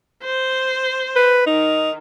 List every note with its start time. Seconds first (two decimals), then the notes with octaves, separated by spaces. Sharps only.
0.24 C5
1.16 B4
1.47 D#3 D#4